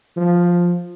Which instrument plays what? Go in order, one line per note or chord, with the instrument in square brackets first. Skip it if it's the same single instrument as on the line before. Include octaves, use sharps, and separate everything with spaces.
[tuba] F3